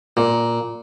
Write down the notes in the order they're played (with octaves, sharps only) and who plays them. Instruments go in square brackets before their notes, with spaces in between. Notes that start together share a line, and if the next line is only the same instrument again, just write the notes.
[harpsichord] A#2